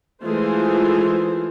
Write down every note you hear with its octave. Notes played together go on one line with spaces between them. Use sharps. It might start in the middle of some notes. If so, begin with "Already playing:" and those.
E3 G#3 A3 F4 G#4 C5